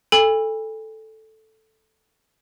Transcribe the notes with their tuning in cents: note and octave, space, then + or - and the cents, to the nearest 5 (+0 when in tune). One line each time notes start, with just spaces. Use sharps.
A4 +0 G#5 -40 B5 +0